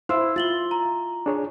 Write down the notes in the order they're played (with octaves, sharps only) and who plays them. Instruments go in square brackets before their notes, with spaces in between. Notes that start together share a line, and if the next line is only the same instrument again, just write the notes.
[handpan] E4 [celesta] C5 [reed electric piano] F5 C6 E6
[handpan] F4 [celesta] A6 F#7 G7
[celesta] A#5
[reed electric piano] D4 G#4 C#5